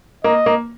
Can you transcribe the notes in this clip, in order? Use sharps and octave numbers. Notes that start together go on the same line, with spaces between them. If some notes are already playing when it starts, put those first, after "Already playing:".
A#3 D#5
A#3